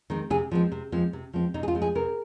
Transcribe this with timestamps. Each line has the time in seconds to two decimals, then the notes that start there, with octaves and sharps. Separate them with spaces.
0.10 D#3 G#3 C4
0.30 C3 G#4
0.51 F3 G#3 C4
0.72 C3
0.92 F3 G#3 C4
1.13 C3
1.33 F3 G#3 C4
1.54 C3 D#4
1.63 G#4
1.68 F4
1.75 F3 G#3 C4
1.82 G#4
1.95 C3 A#4